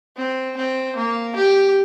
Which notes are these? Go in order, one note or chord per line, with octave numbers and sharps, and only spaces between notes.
C4
C4
A#3
G4